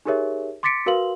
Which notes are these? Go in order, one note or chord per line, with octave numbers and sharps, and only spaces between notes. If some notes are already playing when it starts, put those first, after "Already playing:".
D#4 G4 G#4 A#4 C#5 E5
C6 D6 A6 B6 C#7 D7
F#4 A#4 B4 F5 C6 F#7